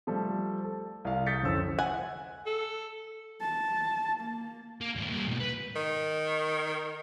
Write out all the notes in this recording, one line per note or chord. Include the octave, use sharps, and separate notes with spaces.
F3 G3 A3 A4
A4
C2 F5
D#6 G6 A6 B6 C#7
D1 F2 C#4 C5 E6
F#5 G#5
A4
A5
A#3
A#3
E2 G#2
G3 A#3
G#2 B2
B4
D#3